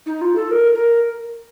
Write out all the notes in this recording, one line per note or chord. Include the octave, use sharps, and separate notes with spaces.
D#4
F4
A4
A#4
A#4